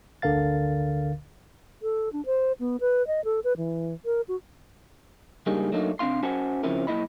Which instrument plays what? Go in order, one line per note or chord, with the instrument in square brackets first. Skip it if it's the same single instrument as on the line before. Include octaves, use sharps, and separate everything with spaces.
[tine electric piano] G1 D2 D3 A#4 F5 A6
[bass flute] A4
D4
C5
B3
B4
D#5
A4
B4
E3
A#4
F#4
[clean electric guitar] C#2 G3 A#3 D4 D#4 G#4
F#3 A3 A#3 D4 D#4
C3 C4 D4 F5 C6
C#4 F#4 C5 F#5 G#5 A5
C#3 F3 C4 C#4 E4 A#4
B1 F3 A#3 E4 D#5 B5